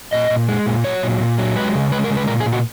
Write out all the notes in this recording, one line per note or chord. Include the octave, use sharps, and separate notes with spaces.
A#2 D#5
A#2
G#3
A#2
F#3 C#5
A#2
A#2
F#3
G#3 B4
C#3
G#3 B4
A#4
C#3
B4
A#2 A#4
G#4
A#2
F#4